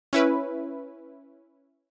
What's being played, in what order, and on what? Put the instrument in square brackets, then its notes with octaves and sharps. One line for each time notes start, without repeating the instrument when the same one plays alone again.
[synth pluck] C#4 E4 B4